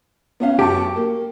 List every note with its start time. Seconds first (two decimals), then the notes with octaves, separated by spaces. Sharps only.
0.40 B3 C#4 F5
0.59 F#2 G4 A5 C#6
0.96 A#3